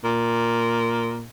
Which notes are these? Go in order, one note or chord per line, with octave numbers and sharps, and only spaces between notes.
A#2